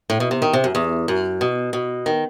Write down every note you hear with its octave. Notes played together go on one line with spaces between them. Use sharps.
A2
B2
C3
D#3
C3
F#2
E2
F#2
B2
B2
D#3